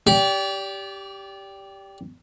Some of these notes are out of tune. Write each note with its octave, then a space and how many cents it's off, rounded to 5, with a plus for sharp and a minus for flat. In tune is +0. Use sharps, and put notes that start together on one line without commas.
G4 +0 D5 -30